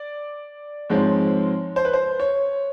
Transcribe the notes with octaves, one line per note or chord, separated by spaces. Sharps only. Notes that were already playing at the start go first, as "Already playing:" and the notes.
Already playing: D5
G#2 F3 G#3 C4 C#5
C5
B4
C5
C#5